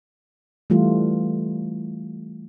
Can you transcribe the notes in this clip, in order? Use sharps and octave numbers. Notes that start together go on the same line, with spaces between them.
E3 G3 A3 F4